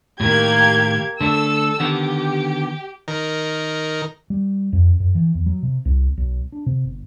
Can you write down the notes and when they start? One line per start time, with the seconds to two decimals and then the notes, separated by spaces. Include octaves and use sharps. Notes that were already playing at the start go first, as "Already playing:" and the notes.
0.20 A2 D#3 A#3 G4 G#6
1.21 D3 A3 D4 A4 E6
1.80 D3 D#3 B3 G4
3.08 D#3 A#4
4.30 G3
4.73 F2
5.00 F#2
5.15 E3
5.35 E2
5.46 F#3
5.63 C3
5.85 C2
6.17 B1
6.52 D4
6.66 C3
6.85 G1